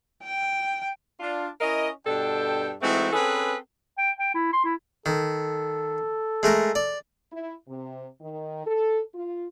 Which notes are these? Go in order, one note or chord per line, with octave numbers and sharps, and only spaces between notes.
G5
D4 F4
C#4 E4 A#4 D#5
G2 B2 D4 A4 G5
E3 G#3 A3 C4 D#4 F#4
C4 C#4 G#4 A4 B4
G5
G5
E4
C6
E4
D#3 A4
G#3 A3 A#4
D5
E4
C3
D#3
A4
F4